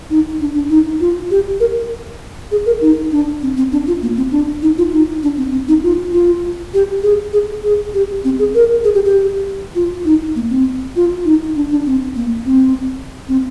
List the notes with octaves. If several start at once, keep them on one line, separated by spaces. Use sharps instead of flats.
D#4
D4
D4
D#4
F4
G4
A#4
G#4
A#4
D#4
D4
C4
C4
D4
F4
A#3
C4
D4
D#4
F4
D#4
D4
C4
C4
D#4
F4
F4
G4
G#4
G#4
G#4
G4
C4
G#4
A#4
G#4
G4
G4
F4
D#4
A#3
C4
F4
D#4
D4
D4
C4
A#3
C4
C4